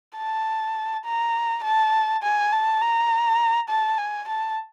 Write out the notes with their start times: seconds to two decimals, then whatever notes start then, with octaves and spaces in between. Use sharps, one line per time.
0.18 A5
1.06 A#5
1.64 A5
2.23 G#5
2.53 A5
2.82 A#5
3.69 A5
3.98 G#5
4.28 A5